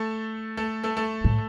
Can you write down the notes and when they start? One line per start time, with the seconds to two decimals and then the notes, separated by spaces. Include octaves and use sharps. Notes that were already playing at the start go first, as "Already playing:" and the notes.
Already playing: A3 A4
0.57 A3 A4
0.84 A3 A4
0.97 A3 A4
1.24 A2